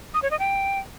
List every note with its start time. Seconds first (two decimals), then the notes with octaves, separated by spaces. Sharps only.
0.14 D#6
0.23 C#5
0.31 D#5
0.39 G5